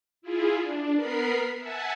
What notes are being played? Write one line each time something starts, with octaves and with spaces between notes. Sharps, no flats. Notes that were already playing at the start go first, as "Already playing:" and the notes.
E4 F4 G#4
D4
B3 A#4 B5 C7
E5 F#5 G#5 A5